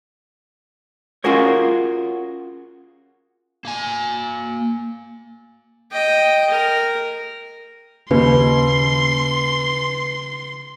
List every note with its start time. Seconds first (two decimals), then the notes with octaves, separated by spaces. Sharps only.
1.24 C#4 F4 F#4 G#4 A#4 C#5
3.65 A#3 G#5
5.92 D#5 G5
6.50 A#4
8.11 D#2 C#3 B4 C6